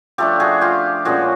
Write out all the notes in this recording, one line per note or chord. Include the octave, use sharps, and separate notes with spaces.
F3 A3 D4 G4 A4
F#4 G#4
F4 G4
A#2 F3 G#3 C#4 F#4 G#4